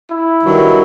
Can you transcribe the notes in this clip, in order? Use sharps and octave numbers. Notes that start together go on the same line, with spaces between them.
E4
G2 D#3 F#3